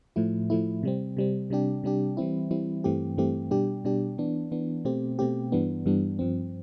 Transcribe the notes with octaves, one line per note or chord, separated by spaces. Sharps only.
A2 F3 A3 E4
A2 F3 A3 E4
C3 G3 C4
C3 G3 C4
C3 G3 D4 G4
C3 G3 D4 G4
E3 G3 C4 E4
E3 G3 C4 E4
G2 E3 A3 C4 G4
G2 E3 A3 C4 G4
B2 G3 D4 G4
B2 G3 D4 G4
E3 B3 D4
E3 B3 D4
B2 A3 C4 G4
B2 A3 C4 G4
G2 E3 G3 B3 D4
G2 E3 G3 B3 D4
G2 F3 C4